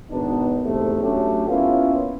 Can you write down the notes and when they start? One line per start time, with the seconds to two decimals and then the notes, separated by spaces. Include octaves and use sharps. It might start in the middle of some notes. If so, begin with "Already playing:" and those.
0.10 G#1 B2 B3 D4 D#4
0.64 E2 G#2 C3 A3
1.01 F#3 A3 C#4 D4 G4
1.48 A#3 B3 C#4 E4 F4